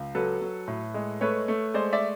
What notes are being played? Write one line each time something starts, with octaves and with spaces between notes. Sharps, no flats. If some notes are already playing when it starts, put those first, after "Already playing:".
Already playing: C#2
F#3 A4 B4
F#3
A2
G#3
A3 B4 C#5
A3
G#3 C5 D5
D5 E5